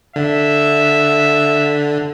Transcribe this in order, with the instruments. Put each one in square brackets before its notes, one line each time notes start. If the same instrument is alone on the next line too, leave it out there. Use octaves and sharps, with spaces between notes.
[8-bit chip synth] D3 [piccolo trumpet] E5